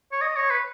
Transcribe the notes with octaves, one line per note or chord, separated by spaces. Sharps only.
C#5
D#5
C#5
B4